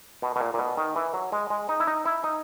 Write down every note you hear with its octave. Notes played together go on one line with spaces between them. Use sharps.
B2
B2
A#2
A#2
B2
D#3
E3
F#3
G#3
G#3
D#4
E4
D#4
E4
D#4